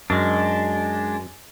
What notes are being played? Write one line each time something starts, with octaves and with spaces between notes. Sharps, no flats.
F#2 G#3 D4